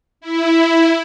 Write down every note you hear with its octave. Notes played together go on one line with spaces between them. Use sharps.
E4